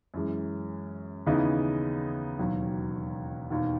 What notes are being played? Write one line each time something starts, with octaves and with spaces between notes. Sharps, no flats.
F#2 E3 G#3
D#2 C#3 E3 B3 D#4
E1 D#2 D#3 F#3
E1 D#2 D#3